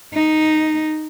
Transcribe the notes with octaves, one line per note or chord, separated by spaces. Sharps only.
D#4